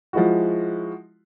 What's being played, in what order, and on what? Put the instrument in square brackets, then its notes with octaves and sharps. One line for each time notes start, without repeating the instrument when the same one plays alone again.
[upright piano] F3 G#3 E4 F#4